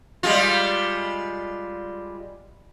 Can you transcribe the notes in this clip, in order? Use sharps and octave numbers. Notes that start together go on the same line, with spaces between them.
G3 G#3 F4